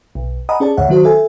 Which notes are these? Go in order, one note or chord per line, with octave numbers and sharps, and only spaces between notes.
B1
D#5 F#5 G#5 A#5 B5 D#6
C#4 G#4 D5 A5
D2 G#2 C#5 E5 F#5
D#3 F#3 F#4 C5
A4 E5 G#5